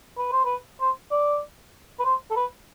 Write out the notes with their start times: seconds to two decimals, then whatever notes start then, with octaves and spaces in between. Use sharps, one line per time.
0.18 B4
0.32 C5
0.45 B4
0.81 C5
1.11 D5
1.99 B4
2.05 C5
2.31 A4
2.36 B4